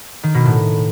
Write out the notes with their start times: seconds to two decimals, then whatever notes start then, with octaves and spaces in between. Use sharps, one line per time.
0.23 D#3
0.34 B2
0.45 A2